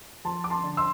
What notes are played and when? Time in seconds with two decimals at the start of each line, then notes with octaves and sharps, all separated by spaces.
0.24 F3 A5 C6
0.44 D6
0.50 A5 C6
0.64 D3
0.77 C6 E6